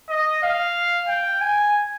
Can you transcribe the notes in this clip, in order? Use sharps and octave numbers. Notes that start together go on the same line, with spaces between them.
D#5
F5
G5
G#5